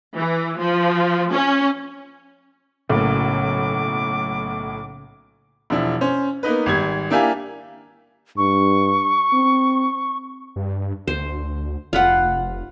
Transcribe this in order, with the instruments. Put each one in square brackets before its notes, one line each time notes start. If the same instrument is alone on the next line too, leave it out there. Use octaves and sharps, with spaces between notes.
[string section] E3
F3
C#4
[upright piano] B1 A2 [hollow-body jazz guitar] C#3 A#3 [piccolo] D6
[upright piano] E1 F3 D4 E4
C#4 C5
A#3 B3 D#4 B4
G#1 G3 G#6
A#3 D4 E4 G4 F5 G#5
[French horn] G2 [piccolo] C#6
[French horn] C4
[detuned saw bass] G2
[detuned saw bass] D2 [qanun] C5
[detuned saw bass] F1 [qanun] F4 B4 F#5